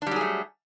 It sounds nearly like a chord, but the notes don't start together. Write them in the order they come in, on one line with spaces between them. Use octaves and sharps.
D4 G3 F#3 G#4 A3